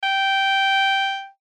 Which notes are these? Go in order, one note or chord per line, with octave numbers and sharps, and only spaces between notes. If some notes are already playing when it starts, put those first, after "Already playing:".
G5